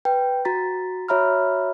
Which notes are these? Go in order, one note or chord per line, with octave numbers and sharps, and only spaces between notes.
B4 G5
F#4 A#5 A6 B6
F#4 C#5 E5 A#5 B5 F6